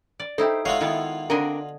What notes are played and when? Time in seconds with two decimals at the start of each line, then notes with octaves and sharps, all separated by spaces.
0.20 D5
0.38 D#4 E4 G4 A4 C5
0.65 G#3 F4 F#4 C#5 E5 F5
0.81 D#3 B3 E4
1.30 D3 C4 D4 A#4 D#5 G#5